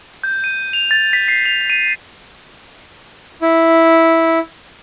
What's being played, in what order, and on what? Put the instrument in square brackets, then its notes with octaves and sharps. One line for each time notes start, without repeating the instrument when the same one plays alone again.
[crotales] G6
D#7
F7
A6
B6
C7
F7
D#7
[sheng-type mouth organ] E4